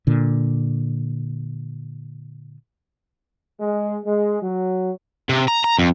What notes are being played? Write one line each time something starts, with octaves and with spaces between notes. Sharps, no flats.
A#2 D3
G#3
G#3
F#3
C3
A#5
A#5
F2